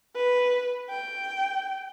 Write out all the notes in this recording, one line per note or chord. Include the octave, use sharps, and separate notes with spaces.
B4
G5